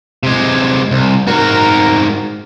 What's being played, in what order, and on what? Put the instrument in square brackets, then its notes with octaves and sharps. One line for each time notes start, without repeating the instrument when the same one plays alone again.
[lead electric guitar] C3 G#3
C2
[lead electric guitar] G#2 F#4 [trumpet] A#4